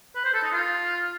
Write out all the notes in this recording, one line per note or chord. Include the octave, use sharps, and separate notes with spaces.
B4
C5
A4
D#4
F4